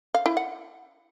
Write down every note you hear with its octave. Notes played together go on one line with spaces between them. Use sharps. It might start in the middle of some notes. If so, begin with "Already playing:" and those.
F5
E4
F#5